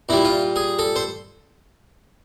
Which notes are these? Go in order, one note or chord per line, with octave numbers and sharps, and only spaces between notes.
A#2 G3 E4
F4
G#4
A4
C5